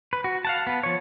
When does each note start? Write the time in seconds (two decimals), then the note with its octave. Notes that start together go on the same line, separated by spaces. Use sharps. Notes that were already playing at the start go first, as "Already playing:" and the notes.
0.13 B4
0.24 F#4
0.45 F5 F#5 A5
0.67 B3 B4
0.83 F3 C#5